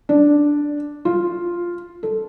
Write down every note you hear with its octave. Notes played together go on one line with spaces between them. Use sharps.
D4
F4
A4